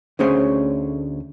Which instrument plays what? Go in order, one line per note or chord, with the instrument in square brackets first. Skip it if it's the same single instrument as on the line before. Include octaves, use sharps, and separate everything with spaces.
[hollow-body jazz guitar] D2 A3 C#4 G#4 C5 C#5